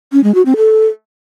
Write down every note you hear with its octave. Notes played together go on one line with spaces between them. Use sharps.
C#4
G#3
F#4
C4
A4